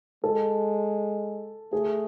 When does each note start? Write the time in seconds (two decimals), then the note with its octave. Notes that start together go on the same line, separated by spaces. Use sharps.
0.24 G#3 A4
1.72 A3 G#4